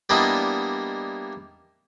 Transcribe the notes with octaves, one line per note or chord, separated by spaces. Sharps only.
G3 A#3 B3 D4 E4 D#5